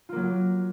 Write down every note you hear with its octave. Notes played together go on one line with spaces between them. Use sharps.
F#3 A#3 F4